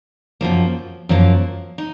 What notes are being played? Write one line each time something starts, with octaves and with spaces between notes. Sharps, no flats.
F#2 F3 A#3
F#2 F3 A#3
D#4